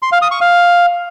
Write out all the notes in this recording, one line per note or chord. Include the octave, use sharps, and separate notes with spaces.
C6
F5
D#6
C#6
F5